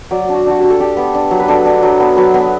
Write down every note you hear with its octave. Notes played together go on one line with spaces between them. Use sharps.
F#3 D5
D4
F#4
D4 F#4
G4
D4
A4
D4 G4
B3
D4
F#3
B4
D4 A4
D4
F#3
B3
F#3 B4
B3